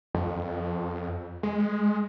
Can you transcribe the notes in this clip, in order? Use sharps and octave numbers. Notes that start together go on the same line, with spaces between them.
F2
G#3